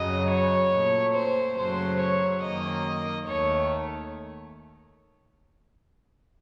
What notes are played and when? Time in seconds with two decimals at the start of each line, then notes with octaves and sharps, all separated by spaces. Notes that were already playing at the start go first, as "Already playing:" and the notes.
Already playing: F#2 C#3 F#3 D#5
0.30 C#5
0.72 A#2 A3
1.14 C5
1.57 F#2 C#3 F#3 A3 C5
2.00 C#5
2.42 F#2 D#3 A#3 D#5
3.27 D#2 D#3 A3 C#5